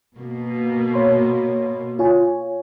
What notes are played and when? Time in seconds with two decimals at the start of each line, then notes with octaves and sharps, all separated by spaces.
0.18 B2 A#3
0.94 C#5 B5 C6
1.99 F4 C#5 G#5